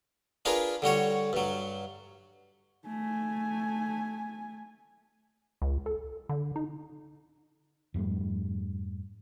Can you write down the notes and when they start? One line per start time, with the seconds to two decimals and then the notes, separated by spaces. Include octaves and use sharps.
0.45 D4 F4 G#4 A#4 B4
0.82 D3 G3 F#4 C#5
1.33 G2 F#3
2.86 A3 G#5
5.62 C#2
5.86 A4
6.29 D3
6.56 D#4
7.94 F2 G#2 G3 A3